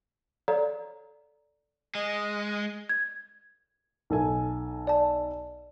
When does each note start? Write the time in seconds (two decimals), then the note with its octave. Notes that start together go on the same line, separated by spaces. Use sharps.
0.48 A4 C#5 D5 F5 A#5
1.95 G#3 D#5
2.89 G#6
4.10 B1 A4 G#5
4.87 D5 A5